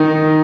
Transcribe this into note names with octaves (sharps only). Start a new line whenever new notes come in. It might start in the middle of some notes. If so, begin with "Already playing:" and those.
Already playing: D#3 D#4